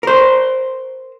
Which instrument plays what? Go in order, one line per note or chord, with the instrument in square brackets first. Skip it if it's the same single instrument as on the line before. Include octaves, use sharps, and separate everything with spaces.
[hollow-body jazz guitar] A#4 C5